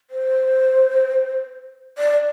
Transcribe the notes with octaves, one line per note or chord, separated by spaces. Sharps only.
C5
D5